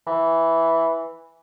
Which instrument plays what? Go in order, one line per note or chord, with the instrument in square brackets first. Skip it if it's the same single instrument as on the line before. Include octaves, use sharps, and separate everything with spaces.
[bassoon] E3